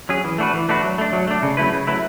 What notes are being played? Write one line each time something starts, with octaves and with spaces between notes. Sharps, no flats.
F#3 C#4 G#4
E3
A3 D4 F#4 B4
E3
A3 D4 F#4 B4
F#3
A3 D4
F#3
A3 D4
C#3
F#3 A3 E4 B4
C#3
F#3 A3 E4 B4